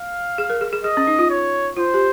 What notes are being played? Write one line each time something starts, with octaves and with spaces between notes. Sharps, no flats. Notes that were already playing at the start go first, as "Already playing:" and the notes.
Already playing: F5
G#4
A#4
G#4
G#4
G#4 D#5
C#4
D#4
F4
C#5
F4 C5
G4